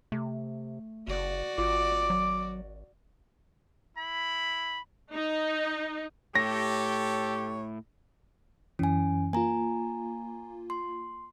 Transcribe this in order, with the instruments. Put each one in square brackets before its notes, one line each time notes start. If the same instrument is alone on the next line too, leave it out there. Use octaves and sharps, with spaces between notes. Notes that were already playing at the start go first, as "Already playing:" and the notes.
[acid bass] C3 [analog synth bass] A3
[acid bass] F#1 [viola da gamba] F#4 D5
[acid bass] G#1 [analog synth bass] F4 [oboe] D6
[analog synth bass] F#3
[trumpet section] E4 B5
[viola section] D#4
[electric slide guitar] A2 [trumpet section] G4 A4 [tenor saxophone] C#5 [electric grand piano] A#6
[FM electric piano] F#2 E3 [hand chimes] C#4 G#5
[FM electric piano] A#3 F4 [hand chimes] G#5 A#5
[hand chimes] C6